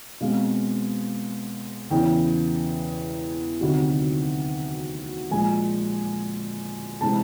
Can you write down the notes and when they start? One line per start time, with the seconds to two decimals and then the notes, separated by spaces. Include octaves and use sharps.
0.20 B2 G#3 C4 F5
1.91 E2 C#3 E3 G5
3.61 D2 C3 D#3 F#3
5.30 A#2 F3 G#3 G#5
7.01 C3 E3 G#3 C4 A5